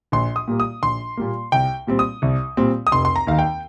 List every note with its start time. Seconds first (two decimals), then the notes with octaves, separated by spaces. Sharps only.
0.12 A#1 C6
0.36 D#6
0.48 A#2 G3 A#3
0.60 D#6
0.82 A#1 C6
1.17 A#2 G3 A#3
1.52 C2 G5
1.87 A#2 G3 C4
1.99 D#6
2.22 C2
2.57 A#2 G3 C4
2.87 D#6
2.92 F1 C6
3.05 C6
3.16 A#5
3.27 D#2 D#3 F5
3.39 G5